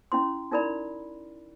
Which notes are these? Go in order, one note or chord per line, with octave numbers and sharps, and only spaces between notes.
C#4 E4 C6
D#4 E4 A#4 D5 B5